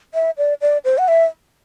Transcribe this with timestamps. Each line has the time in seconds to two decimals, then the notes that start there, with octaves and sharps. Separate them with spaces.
0.14 E5
0.38 D5
0.61 D5
0.85 C5
0.98 F#5
1.08 E5